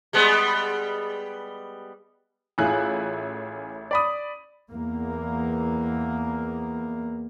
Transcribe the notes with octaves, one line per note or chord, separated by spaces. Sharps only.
G3 G#3 B3
A1 E4 F4 G#4 G#5 F#6
D5 B5 D#6
E2 A#3